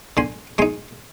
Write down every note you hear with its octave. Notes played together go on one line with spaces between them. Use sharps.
D3 G#5 C6
G#3 D#4 G#5 C6